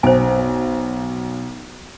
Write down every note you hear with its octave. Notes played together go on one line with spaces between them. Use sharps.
B1 C5 G#5